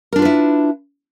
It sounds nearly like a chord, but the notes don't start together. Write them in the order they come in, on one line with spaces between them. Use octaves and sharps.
A#4 D4 F4 B4 E4